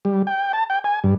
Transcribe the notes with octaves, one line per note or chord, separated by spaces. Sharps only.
G3
G5
A5
G5
G#5
G2